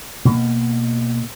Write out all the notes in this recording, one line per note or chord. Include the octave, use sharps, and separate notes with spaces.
B2 A#3